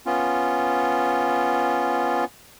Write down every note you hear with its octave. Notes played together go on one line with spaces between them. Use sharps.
B3 C#4 F4